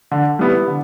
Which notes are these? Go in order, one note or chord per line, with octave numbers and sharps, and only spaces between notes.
D3
G3 B3 E4
D3